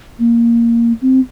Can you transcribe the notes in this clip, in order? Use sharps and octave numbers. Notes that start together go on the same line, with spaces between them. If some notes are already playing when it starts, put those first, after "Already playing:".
A#3
C4